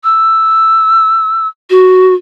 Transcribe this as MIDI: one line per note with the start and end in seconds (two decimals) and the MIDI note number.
0.04 1.48 88
1.70 2.14 66